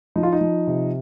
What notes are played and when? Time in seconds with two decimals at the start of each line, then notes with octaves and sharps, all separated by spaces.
0.16 F3 D#4
0.23 F4
0.33 D#4
0.41 F3
0.67 C3